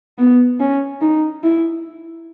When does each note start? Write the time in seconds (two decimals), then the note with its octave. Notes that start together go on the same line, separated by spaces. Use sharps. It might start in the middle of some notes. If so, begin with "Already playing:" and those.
0.18 B3
0.60 C#4
1.01 D#4
1.43 E4